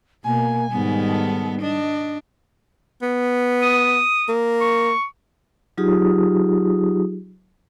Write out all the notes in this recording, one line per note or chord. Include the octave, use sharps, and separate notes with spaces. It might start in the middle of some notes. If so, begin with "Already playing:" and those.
B2 A#3 G#5
G#2 D#3 G3 B3
A4
D4 D#5
B3
D#6
A#3
C#6
F#3 D#4 F4 G4 G#4 D#6